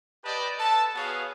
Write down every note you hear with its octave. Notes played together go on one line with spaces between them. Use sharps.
G4 B4 D5 D#5 A5
A4 B4 A5
B3 F#4 G#4 C#5 F5